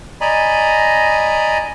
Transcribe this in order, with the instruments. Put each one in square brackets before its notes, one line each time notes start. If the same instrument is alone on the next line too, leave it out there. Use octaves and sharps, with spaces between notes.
[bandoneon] D5 D#5 G#5 A#5 B5